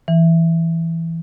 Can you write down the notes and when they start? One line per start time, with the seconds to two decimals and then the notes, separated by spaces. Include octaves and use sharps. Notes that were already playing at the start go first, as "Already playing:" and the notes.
0.08 E3